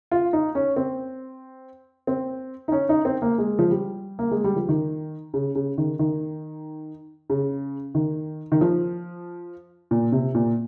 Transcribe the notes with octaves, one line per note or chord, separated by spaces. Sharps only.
F4
D#4
C#4
C4
C4
D#4
C#4
D#4
C4
A#3
G#3
F3
G3
A#3
G#3
G3
F3
D#3
C#3
C#3
D#3
D#3
C#3
D#3
D#3
F3
A#2
C3
A#2